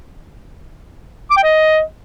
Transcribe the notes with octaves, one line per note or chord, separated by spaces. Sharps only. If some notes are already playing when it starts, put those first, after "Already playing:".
D6
G5
D#5